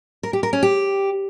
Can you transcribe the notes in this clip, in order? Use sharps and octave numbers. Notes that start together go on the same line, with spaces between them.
A#4
G4
A#4
C#4
G4